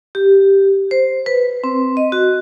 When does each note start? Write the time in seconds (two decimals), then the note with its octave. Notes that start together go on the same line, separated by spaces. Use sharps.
0.15 G4
0.91 C5
1.26 B4
1.64 C4
1.97 D#5
2.12 F#4